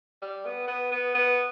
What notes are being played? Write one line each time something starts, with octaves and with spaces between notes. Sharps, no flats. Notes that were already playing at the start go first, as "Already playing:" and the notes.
G3
B3
B3
B3
B3